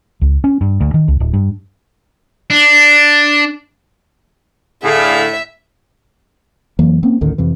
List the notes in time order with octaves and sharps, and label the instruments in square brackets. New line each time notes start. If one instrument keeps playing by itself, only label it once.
[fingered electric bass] C#2
C#4
G2
D2
D#3
C#2
D1
G2
[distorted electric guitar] D4
[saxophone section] A2 [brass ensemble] D3 F5 [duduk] G#4 [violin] E5
[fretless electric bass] F2 E3 F#3 A#3
A#3 C4 C#4
A1 D2 D3 D#3
F2 C3 E3